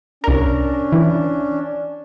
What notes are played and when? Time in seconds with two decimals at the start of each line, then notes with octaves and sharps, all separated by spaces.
0.24 C2 C#4 D4 A#4
0.92 E3